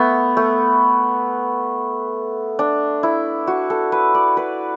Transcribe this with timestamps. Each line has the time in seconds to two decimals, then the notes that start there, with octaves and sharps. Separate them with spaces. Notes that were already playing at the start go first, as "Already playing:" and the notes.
Already playing: A3 B3
0.37 A3
2.59 D4
3.03 E4
3.47 F#4
3.70 A4
3.92 B4
4.15 D5
4.37 B4